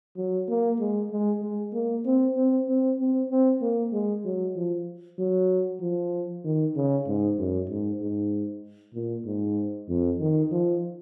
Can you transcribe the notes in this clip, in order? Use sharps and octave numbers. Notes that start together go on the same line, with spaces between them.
F#3
A#3
G#3
G#3
G#3
A#3
C4
C4
C4
C4
C4
A#3
G#3
F#3
F3
F#3
F3
D#3
C#3
G#2
F#2
G#2
G#2
A#2
G#2
F2
D#3
F3